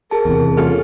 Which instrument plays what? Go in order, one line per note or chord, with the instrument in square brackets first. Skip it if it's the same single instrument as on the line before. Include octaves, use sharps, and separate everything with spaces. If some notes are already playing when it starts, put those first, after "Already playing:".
[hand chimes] G#4 A5 [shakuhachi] A#4
[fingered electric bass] E2 C3
[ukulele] C#4 F4 A4 [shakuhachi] A#4